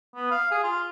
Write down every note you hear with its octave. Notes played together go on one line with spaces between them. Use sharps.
B3
F5
G#4
F4